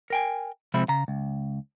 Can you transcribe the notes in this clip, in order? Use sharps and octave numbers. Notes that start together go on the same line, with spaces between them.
A#4 G5 G#5
C3 F3 G#3 C4 E5 B5
C#3 A#5
C#2